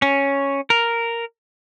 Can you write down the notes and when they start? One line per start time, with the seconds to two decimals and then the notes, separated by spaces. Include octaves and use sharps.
0.02 C#4
0.70 A#4